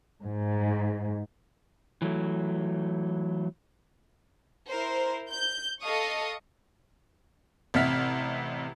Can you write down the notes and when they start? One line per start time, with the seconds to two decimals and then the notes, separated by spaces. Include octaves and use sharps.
0.25 G#2
2.02 E3 F#3 A3
4.69 E4 A#4 C5
5.30 G6
5.82 A4 D#5 F5 C#6 D#6
7.74 A1 C3 E5 F#5 F6 B6